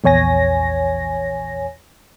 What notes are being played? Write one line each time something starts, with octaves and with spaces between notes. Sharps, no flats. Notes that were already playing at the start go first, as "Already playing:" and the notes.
A#1 E2 C#5 G#5 A#6